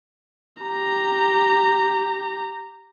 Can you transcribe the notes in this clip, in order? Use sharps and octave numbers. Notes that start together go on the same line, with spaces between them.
G4 A#5